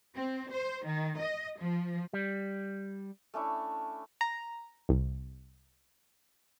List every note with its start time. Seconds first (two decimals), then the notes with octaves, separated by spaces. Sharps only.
0.15 C4
0.51 C5
0.86 D#3
1.21 D#5
1.61 F3
2.13 G3
3.34 A3 C#4 D4 E4
4.21 A#5
4.89 C2